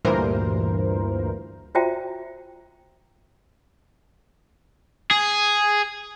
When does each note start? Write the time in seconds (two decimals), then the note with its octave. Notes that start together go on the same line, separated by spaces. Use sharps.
0.05 D2 G2 A#2 E3 A#4 C5
1.75 F4 F#4 C5 E5 G5 A#5
5.11 G#4